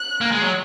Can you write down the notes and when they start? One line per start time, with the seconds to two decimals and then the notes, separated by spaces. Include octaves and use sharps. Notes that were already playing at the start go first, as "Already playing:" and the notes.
Already playing: F#6
0.21 A#3
0.32 G#3
0.42 F#3